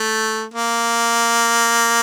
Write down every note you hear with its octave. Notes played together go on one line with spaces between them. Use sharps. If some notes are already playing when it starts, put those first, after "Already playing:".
Already playing: A3
A#3